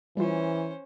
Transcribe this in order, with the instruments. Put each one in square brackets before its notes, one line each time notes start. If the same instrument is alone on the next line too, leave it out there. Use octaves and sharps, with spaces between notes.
[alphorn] E3 [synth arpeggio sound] G3 F4 [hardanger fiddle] C#4 C5